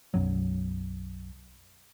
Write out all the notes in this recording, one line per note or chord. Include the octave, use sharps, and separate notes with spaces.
B1 F#2 F#3